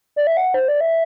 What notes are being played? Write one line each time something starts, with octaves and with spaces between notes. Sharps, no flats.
D5
E5
F#5
C5
D5
E5